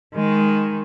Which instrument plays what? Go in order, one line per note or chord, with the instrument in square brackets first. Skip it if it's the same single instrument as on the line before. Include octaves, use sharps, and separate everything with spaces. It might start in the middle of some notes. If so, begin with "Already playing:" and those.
[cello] D#3 G#3